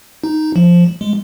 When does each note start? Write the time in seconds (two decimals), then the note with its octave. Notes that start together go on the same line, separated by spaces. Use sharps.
0.24 D#4
0.56 F3
1.01 G#3